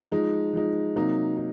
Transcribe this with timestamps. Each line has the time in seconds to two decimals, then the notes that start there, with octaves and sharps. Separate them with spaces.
0.12 F3 G#3 D#4
0.53 F3 G#3 D#4
0.96 C3 F#3 A#3 D#4
1.37 D#4